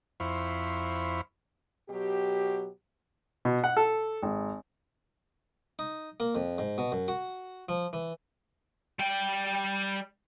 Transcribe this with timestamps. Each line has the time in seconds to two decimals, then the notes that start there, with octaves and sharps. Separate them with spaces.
0.20 F2 E4 C5 F5 B5 C#6
1.90 B2 F#3 G4
3.45 B2
3.64 F#5
3.77 A4
4.23 G#1
5.79 D#4
6.20 A#3
6.35 F2
6.58 G#2
6.78 B2
6.92 F#2
7.08 F#4
7.69 F3
7.93 E3
8.99 G3 G5